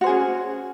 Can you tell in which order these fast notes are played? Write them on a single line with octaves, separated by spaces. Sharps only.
F#4 C5 G#4 C#4